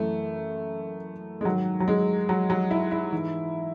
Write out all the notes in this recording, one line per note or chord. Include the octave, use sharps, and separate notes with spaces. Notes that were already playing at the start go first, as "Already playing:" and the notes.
Already playing: F#2 E3 A3
G#3
G#2 D#3 F#3
F#3
G#3
F#3
F#3
E4
E4
G#2 E3